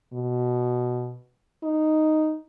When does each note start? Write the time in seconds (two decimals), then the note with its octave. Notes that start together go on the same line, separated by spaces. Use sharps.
0.13 B2
1.64 D#4